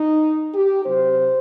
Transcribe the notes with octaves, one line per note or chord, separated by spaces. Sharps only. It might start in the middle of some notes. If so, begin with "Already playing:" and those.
Already playing: D#4
G4
C3 F#3 C4 C5